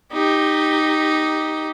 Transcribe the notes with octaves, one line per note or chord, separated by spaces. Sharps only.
D#4 G4